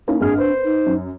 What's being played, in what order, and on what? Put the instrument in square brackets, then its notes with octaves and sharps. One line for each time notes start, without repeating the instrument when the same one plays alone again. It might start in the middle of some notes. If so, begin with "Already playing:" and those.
[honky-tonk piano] A#3 C#4 E4 [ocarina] D#4
[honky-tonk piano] G#1 F6 [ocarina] D4 [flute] G#4
[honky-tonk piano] B4 [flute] C5
[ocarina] D#4
[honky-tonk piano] F#2